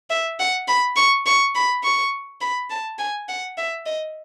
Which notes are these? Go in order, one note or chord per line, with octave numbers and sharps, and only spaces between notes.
E5
F#5
B5
C#6
C#6
B5
C#6
B5
A5
G#5
F#5
E5
D#5